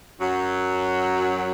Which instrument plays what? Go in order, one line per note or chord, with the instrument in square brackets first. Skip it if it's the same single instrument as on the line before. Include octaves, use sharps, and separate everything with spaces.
[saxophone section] F#2 F#3